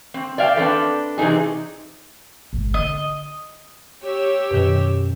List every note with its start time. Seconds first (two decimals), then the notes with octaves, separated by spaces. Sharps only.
0.14 C4
0.38 D5 E5 F5 G5
0.56 C4 D4 A4 B4
1.18 C3 E3 C4 D#4 G#4
2.53 G#1 A2
2.74 D3 C#4 D#5
4.03 G4 C#5 E6
4.51 F#2 B2 D#3